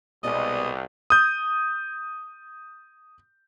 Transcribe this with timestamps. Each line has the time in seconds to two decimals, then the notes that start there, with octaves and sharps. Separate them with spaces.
0.23 C2 B2 G#3 D5 D#5
1.10 D#6 G6